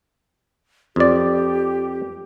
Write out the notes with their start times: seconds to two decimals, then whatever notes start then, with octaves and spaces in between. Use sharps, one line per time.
0.96 F2 G4 D5